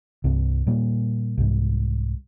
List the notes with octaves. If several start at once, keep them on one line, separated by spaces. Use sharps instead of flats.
C2 G2 C4
A#2 G3 A#3
C2 G#2